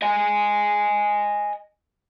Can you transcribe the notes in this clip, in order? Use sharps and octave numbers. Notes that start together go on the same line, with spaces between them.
D#5 G#5